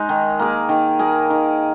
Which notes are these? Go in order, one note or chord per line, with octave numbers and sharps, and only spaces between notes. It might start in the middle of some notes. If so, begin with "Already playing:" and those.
Already playing: G#3 D#4
D#3
A#3 G#4
D#3
A#3 G#4
D#3